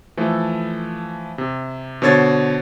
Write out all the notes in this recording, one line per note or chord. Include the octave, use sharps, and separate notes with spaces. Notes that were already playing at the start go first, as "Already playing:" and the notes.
E3 F3 A3 A4
C3
B2 D3 C5 C#5 G#6 A6